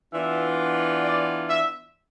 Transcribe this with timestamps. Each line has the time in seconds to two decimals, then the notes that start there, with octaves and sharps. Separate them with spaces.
0.13 E3 B3 D4 F4 E5
1.04 D5
1.49 E5